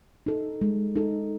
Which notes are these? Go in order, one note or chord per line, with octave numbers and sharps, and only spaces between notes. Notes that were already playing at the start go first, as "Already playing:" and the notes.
D#4 A4
G#3
D#4 A4